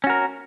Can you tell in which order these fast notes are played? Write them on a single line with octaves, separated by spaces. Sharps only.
C#4 F#4 A#4